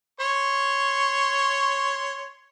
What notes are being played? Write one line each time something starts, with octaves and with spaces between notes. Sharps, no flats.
C#5 C6 C#6